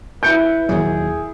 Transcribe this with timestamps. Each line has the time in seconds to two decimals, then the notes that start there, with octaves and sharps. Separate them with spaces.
0.23 E4 B4 G6 C#7 D7
0.69 D#2 A#2 F#3 G#4